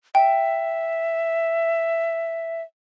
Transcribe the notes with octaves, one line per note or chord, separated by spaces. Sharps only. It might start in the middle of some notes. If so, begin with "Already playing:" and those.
E5 G5